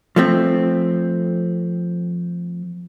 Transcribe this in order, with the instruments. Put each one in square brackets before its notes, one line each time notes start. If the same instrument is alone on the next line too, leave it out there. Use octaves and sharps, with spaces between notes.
[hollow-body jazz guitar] F3 A3 C4